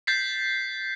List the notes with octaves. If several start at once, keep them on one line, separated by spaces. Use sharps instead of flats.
G6 A6 B6 C7